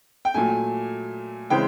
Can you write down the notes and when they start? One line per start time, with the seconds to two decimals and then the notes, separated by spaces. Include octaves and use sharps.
0.25 G5
0.34 A#2 F#3 A3 G#5
1.50 C#3 E3 G#3 C4 G5